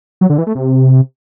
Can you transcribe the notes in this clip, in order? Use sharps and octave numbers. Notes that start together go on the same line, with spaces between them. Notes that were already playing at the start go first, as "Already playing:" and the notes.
F#3
D3
E3
A3
C3